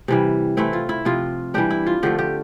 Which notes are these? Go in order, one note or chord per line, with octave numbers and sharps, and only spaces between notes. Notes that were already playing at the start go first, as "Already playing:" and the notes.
C3 E3 G3
E3 A3 C4 E4
F4
E4
C3 F3 C4 F4
E3 G3 D4 G4
E4
F4
D3 F3 A3 G4
G4